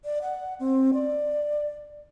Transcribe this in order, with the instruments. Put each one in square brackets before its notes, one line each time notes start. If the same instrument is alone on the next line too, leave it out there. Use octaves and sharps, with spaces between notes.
[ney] D5
F#5
C4
D5